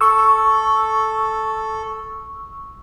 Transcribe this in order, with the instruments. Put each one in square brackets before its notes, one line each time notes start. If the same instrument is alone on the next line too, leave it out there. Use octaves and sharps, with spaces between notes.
[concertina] A4 [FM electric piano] C#6 E6